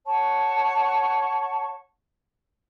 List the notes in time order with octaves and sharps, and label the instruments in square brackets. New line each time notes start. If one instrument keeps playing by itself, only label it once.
[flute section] C#5 F#5 A5 C#6